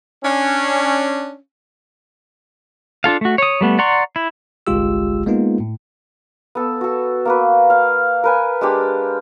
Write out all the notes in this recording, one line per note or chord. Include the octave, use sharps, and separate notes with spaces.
C#4 D4
D4 F4 A4 F5
A3 F#4
C#5 D#6
G3 A3 B3
D5 F#5 A#5 C6 C#6
E4
G1 C2 G#3 F4 G4 E6
G#3 A#3 B3 D#4 F4
A2
B3 A4
F#4 A4
A#3 F#4 B4
F5
A#4 B4 G#5
G#3 D4 G4